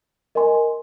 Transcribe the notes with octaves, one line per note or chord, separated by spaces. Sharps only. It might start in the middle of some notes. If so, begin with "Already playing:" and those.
A#4 D#5 G#5 C6